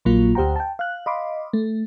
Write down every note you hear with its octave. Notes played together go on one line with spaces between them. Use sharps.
A#1 A#2 F#3 A#3 F4
D2 G4 C5 F#5 G5 A#5
G5 A5
F5 F#6
D#5 F5 B5 C6 D6
A3